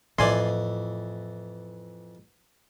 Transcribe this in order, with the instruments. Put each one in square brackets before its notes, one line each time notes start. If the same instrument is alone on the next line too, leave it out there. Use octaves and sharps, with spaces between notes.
[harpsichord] F2 E3 [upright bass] A2 F4 [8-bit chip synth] D5 G#5 C6